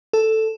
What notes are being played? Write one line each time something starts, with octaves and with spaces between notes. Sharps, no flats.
A4